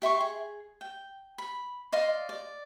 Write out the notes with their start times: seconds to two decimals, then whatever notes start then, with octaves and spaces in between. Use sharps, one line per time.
0.02 G4 E5 C6 C#6
0.21 G#4
0.81 G5
1.38 B5
1.92 D5 D#5 F5 C6
2.29 D5